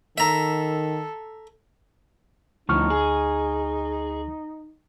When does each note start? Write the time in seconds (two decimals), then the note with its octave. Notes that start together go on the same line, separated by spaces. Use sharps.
0.18 D#3 A4 E5 A#5
2.69 D2 A2 F3 D#4 C#6 F6
2.90 G#4